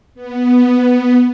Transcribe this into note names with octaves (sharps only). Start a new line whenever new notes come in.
B3